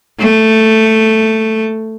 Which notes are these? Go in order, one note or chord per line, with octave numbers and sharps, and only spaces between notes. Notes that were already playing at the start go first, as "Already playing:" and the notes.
A3